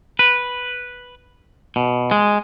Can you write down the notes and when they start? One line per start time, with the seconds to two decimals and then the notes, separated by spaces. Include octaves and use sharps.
0.19 B4
1.76 B2
2.11 G#3